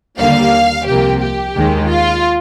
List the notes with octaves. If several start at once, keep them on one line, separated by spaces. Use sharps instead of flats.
D#2 D3 G3 A#3 F5
C2 C3 F3 A#3 G4
G4
D#2 D#3 G#3
F4